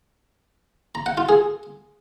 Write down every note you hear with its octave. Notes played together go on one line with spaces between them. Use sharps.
A#5
F#5
F4
G#4